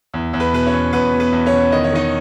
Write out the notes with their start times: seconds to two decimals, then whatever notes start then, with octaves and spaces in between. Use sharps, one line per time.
0.14 E2
0.33 E2
0.40 B4 B5
0.53 B2 B4
0.66 C#4 C#5
0.73 E2
0.93 E2 B3 B4
1.13 B2
1.20 B3 B4
1.32 E2
1.46 C#4 C#5
1.53 B2
1.72 D#3 D#5
1.84 C#5
1.92 D#3 D#4 D#5